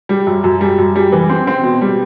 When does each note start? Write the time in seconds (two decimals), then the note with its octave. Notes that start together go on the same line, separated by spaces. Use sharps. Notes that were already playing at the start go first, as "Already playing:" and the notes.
0.09 G3
0.27 F#2
0.44 F#2
0.61 G3
0.78 F#2
0.96 G3
1.12 E3
1.30 C4
1.47 C4
1.64 B2
1.81 G3